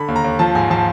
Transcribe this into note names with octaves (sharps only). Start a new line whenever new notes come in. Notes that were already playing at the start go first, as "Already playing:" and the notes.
Already playing: D3 B5
D#2
A#5
D#2
F3 A5
G#2 G#5
F3 A5